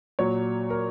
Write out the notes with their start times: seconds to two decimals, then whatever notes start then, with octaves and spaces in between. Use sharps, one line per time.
0.19 A#2 F#3 C#5
0.70 A#4